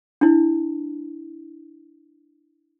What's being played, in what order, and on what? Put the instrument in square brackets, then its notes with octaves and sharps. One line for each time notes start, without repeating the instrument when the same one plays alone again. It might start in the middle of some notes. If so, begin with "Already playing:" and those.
[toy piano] D4 E4